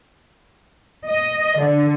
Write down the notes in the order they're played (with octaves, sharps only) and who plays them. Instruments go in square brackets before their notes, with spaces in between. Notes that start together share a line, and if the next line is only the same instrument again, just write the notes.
[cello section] D#5
D3